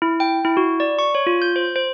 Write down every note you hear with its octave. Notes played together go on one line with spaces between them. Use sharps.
E4
G5
E4
F#4
D5
C#6
C#5
F4
G6
C5
C5